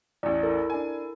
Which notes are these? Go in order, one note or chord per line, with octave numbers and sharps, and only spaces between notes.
A1 E2 D5
E4 A4 A#4
D4 G#5